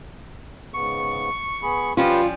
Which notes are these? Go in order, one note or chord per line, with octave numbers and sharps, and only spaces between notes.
G#2 C#3 B3 C#6
B3 G#4 B5
F3 G3 C#4 F4 G4 B4